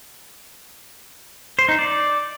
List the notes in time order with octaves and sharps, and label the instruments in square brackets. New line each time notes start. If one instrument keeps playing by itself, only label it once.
[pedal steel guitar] C5
D#4
D5